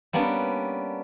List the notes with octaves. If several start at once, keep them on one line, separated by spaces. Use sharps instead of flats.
G3 A#3 B3 C#4 D4